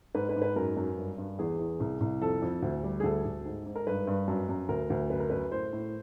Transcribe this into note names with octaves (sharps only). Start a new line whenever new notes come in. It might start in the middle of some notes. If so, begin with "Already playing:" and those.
G#2 B4
B4
G#2
B4
F#2 A#4
F#2
G2
G2
E2 G#4
E2
C2
C2
F2 A4
F2
D2
G3
G#4
D2 A4
D2
G#2
G#2
A#4
G2 B4
G2
F#2
F#2
D2 A#4
D2
F#2 B4
A#4
F#2 B4
A2 C5
A2